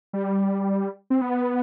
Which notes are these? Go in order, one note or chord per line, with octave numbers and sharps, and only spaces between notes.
G3
C4
B3